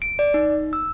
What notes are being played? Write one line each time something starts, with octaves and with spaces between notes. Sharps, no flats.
D7
D5
D#4
E6